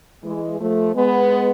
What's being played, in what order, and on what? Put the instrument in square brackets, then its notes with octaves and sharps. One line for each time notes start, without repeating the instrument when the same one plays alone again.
[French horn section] E3 G#3
F3 A3
G#3 B3